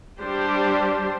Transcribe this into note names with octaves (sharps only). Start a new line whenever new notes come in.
G3 D4 G4 C5